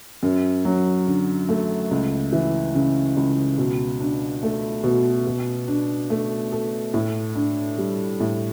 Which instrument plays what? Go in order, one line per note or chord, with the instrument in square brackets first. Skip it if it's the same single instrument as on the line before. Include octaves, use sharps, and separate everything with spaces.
[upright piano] F#2
F#3
D3
A3
C#2
E3
C#3
C#2
B2
D4
A3
B2
B2
D4
A3
A4
A2
D4
G3
A2